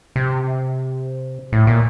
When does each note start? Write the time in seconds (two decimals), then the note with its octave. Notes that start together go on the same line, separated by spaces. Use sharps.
0.16 C3
1.52 A2
1.67 A#2